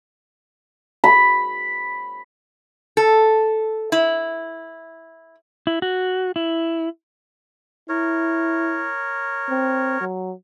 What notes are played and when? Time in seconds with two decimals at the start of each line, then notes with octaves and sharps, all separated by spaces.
1.04 B5
2.97 A4
3.92 E4
5.67 E4
5.82 F#4
6.36 E4
7.89 E4 A#4 C#5
9.50 C4
10.01 F#3